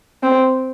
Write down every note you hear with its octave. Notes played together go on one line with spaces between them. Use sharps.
C4